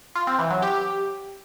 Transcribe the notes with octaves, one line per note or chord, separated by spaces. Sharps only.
F4
C4
E3
F#3
G4